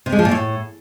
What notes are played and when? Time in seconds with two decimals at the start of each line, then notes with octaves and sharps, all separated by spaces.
0.06 C3
0.12 G#3
0.19 F3
0.25 A#2
0.31 A2